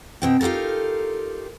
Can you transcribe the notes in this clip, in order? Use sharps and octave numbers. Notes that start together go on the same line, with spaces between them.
B2 C4 G5
D#4 F4 G4 A4 A#4